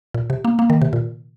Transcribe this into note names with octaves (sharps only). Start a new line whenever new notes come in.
A#2
C3
A#3
A#3
D#3
C3
A#2